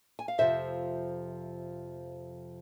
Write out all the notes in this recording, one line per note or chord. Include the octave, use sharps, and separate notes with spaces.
G#5
F5
F2 C3 F3 C5 E5